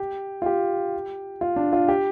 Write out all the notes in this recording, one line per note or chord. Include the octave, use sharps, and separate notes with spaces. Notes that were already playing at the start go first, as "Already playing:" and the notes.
Already playing: G4
F4
G4
F4
D4
F4
G4